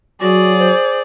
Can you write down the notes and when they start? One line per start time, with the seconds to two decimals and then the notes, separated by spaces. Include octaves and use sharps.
0.21 F#3 F#4 G#4 D5
0.59 C5